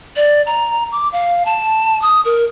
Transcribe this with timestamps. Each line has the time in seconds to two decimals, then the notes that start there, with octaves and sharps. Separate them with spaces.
0.16 D5
0.46 A#5
0.92 D6
1.12 F5
1.45 A5
2.02 D#6
2.25 A#4